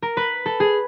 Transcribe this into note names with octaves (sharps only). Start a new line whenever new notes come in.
A#4
B4
A4
G#4